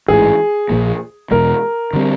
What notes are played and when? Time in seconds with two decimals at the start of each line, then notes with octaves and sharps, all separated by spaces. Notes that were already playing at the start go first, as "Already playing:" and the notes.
0.08 A1 G#2 E3 G#4
0.70 A#1 A#2 F3 A#3
1.31 E2 B2 G#3 A#4
1.93 D3 G3 C4